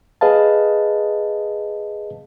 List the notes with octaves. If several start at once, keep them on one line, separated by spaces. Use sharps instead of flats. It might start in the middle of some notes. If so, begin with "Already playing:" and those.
G#4 B4 D#5 F5 A5